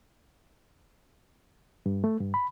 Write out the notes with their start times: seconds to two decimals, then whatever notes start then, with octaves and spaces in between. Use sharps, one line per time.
1.86 G2
2.04 A3
2.21 G2
2.34 B5